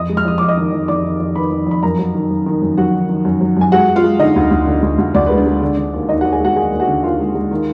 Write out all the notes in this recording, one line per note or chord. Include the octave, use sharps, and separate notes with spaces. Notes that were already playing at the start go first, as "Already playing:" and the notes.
Already playing: F2 D#5 D#6
G#3
F6
F2 D#6
F2 D6
D#5 D#6
D#3
F2
F2 D5 D6
D#3
F2
D#3 B4 B5
F2
F2 B5
F#2 A#4 A#5
F#3
D#3
F#2
D#3
F#2
F#2 F#4 F#5
D#3
D#3
F#2
F#3
F#2 G#5
G#3 F#4 F#5
G#3
F4 F5
G#3
D3 D#4 D#5
D2
D2
D3
D2
D2
D2 D5
G#3 B4
D4 D5
G#3
D3
D3
D#2
D#2 D#4 D#5
D#2 F#4 F#5
G#4 G#5
G#3 F#4 F#5
D#2 G#4 G#5
D#2
F#4 F#5
D3
D#2 F4 F5
G#3
G#3
D#3